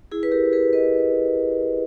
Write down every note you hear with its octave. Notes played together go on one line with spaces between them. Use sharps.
E4 G#4
B4
G4 A#4
G#4 B4
B4 D#5